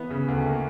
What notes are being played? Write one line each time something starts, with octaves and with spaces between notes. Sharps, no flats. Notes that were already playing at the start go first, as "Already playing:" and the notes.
Already playing: E3 B3
C#3
D2
A#3